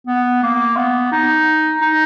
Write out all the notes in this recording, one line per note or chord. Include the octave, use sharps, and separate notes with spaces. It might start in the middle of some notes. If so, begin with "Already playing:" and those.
B3
A#3
B3
D#4
D#4